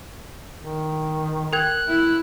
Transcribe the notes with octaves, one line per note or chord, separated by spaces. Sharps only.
D#3
A#4 G5 F#6 G#6
E4